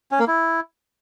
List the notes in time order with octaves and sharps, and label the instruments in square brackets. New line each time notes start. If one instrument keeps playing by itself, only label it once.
[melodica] C#4
A#3
E4